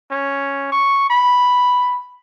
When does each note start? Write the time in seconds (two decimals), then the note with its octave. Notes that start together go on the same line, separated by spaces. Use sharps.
0.11 C#4
0.72 C#6
1.10 B5